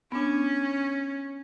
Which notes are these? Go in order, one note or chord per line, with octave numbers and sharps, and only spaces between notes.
B3 C#4 D4